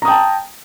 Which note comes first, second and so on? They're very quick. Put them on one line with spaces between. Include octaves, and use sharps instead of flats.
A#5 D#6 G5 A5